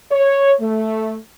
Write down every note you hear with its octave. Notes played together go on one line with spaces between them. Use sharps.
C#5
A3